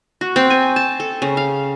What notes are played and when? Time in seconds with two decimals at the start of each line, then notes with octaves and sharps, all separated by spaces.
0.21 F#4
0.36 C4
0.50 G#5
0.76 A5
1.00 A4
1.22 C#3
1.37 F5